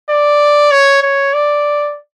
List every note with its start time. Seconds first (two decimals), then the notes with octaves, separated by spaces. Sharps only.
0.10 D5
0.71 C#5
1.02 C#5
1.33 D5